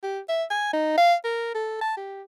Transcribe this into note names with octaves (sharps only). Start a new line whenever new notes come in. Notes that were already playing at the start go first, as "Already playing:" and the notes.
G4
E5
G#5
D#4
F5
A#4
A4
A5
G4